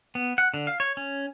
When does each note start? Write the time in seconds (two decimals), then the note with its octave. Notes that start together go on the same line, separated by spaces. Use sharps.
0.15 B3
0.38 F#5
0.54 D3
0.67 F5
0.80 C#5
0.97 C#4